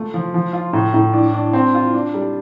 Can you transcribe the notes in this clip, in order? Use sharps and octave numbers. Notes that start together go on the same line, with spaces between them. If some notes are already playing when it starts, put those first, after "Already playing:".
Already playing: A3 F4
F3
F3
F4
A2
A2
D4
D4
C4
F4
D4
G3